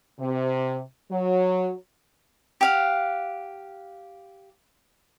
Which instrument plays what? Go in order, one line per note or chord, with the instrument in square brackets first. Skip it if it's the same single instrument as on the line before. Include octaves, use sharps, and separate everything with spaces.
[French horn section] C3
F#3
[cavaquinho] G4 F5 F#5